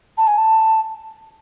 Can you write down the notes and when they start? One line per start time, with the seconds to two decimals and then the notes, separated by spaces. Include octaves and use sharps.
0.18 A5
0.27 G#5
0.38 A5